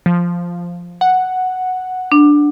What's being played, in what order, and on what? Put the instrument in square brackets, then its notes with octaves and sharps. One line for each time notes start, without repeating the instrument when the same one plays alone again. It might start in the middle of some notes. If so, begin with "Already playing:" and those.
[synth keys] F3
F#5
[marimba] D4